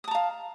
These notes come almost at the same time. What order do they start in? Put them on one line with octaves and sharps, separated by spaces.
D#6 A5 A#5 F5